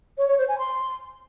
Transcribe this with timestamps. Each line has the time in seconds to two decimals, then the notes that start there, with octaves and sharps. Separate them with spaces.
0.18 C#5
0.28 C#5
0.38 C5
0.48 G#5
0.59 C6